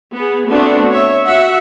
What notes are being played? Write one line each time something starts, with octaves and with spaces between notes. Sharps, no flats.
B3 G#4
A3 B3 C4 D4 F#4
C#5 E5
F#4 E5 F#5